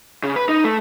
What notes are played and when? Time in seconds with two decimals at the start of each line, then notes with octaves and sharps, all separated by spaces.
0.23 C#3
0.36 B4
0.49 D#4
0.64 A3